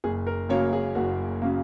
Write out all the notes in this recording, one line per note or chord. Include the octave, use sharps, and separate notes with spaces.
F#1 G#4
A#4
F#2 C#3 F#3 A#3 C#5
G#4
F#1 F#4
C#3 F#3 A#3